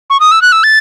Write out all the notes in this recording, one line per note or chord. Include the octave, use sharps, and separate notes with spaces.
C#6
D#6
E6
F#6
E6
A6